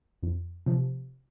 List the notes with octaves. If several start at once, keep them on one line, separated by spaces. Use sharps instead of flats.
F2
C3 F3